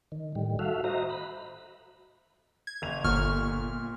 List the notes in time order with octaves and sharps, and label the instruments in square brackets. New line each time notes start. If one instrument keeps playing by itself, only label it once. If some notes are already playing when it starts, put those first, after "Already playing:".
[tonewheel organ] D#3
A2 D#3 G3
F#4 A4 E5 F5
F#4 C5 D#5 E5 A#5
B5
[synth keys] G#6
[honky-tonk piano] F#1 F7
[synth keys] G1 C#6 F6 [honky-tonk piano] A#2